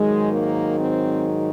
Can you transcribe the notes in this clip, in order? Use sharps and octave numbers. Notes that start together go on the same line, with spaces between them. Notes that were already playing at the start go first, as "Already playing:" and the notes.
Already playing: G#2 D#3 F#3 G#3
A#3
C4